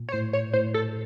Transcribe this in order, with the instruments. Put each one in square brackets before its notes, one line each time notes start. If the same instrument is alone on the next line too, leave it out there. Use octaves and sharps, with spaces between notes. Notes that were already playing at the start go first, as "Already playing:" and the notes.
Already playing: [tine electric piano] A#2
[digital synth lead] C#5
[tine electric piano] A2 [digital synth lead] C5
[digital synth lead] C#5
[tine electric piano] A2 [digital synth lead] C5
[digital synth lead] A4